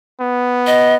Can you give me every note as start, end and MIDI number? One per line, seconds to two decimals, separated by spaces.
0.21 0.97 59
0.67 0.95 75